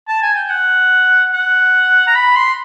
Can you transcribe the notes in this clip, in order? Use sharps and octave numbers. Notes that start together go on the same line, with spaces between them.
A5
G#5
G5
F#5
F#5
A#5
B5
C6